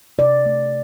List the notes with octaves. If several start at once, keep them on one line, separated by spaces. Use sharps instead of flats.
C3 D5
A3